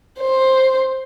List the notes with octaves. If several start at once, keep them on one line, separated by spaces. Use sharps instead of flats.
C5